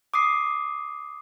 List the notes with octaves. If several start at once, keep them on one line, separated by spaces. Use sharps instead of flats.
D6 D#6 C7